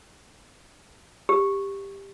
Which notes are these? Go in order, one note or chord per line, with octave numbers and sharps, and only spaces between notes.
G4